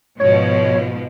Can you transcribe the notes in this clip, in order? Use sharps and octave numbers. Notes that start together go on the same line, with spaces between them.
G#2 B2 F3 C#5